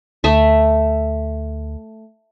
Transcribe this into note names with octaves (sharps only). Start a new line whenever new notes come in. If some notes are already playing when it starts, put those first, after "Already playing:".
D2 A3 E5